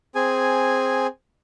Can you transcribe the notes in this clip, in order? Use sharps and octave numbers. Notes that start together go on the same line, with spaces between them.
C4 G#4 G#5